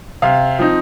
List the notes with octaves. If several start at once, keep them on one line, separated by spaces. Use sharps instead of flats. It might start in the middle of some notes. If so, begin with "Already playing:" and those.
C3 F5
F3 C4 D#4